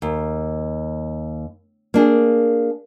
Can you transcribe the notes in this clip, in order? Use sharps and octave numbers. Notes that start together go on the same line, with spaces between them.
D#2
A#3 D4 G#4